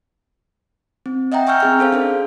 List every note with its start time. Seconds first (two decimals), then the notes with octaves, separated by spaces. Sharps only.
1.06 C4
1.32 D#5 E5 F#5 G5 A#5
1.47 G5 G#5 C#6 E6 F6 G6
1.60 C4 G#4 F6
1.79 C#4 A4 C5 F5
1.93 D4 G#4 A#4